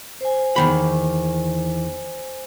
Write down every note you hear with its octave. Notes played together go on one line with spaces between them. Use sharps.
C5 G#5
E2 D#3 B5